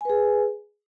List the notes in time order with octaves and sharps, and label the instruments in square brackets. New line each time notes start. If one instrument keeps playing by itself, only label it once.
[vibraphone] G#5
B4
G#4